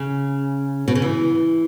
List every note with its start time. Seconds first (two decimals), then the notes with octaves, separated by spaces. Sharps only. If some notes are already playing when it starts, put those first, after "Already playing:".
Already playing: C#3
0.88 B2
0.95 C#3
1.02 E3